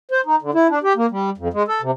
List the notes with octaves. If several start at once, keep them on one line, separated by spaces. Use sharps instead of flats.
C5
D#4
D3
E4
D4
G4
A#3
G3
F2
G#3
A4
C3